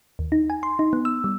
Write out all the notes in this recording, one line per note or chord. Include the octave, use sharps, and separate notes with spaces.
D#2
D#4
G#5
C6
D#4
B3
E6
G3